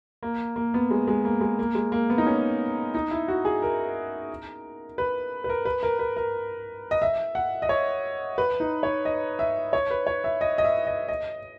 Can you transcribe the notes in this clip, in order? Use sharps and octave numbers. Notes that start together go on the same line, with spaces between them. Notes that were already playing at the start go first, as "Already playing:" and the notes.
A#3
A#3
B3
G#3
G#3
A#3
G#3
A#3
G#3
A#3
B3
D#4
C#4
D#4
E4
F#4
G#4
A#4
B4
B4
A#4
B4
A#4
B4
A#4
D#5
E5
F#5
D#5
C#5
B4
D#4
C#5
D#5
E5
C#5
B4
C#5
E5
D#5
D#5
E5
D#5
D#5